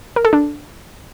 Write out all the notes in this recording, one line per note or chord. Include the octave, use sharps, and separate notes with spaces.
A#4
A4
D4